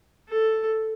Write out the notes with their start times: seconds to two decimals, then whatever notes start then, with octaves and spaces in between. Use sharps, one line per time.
0.29 A4